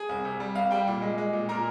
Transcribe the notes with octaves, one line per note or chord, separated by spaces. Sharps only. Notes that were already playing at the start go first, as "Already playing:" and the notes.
Already playing: G#4 G#5
C2
C3
G3
C2 F5
G3 G5
A#2
G#3
G#3
A#2
A#2 A#4 A#5